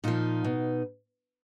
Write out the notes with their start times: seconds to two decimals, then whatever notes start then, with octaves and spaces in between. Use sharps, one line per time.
0.04 A#2 F3 D#4
0.44 B2